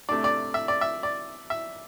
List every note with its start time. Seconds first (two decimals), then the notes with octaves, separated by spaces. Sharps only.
0.09 C3 A3 D4 D5
0.24 D5
0.54 E5
0.68 D5
0.81 E5
1.03 D5
1.50 E5